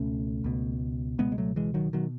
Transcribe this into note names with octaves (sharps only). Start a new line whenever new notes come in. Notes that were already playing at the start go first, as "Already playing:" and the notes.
Already playing: C#2 B2 A3 C#4
C#2 B2
C#2 B2 G#3 B3
G#3
F#3 A3
E3 G#3
D#3 F#3
B2 D#3 F#3